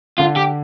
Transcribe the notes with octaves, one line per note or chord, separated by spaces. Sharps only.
D3 F4
G4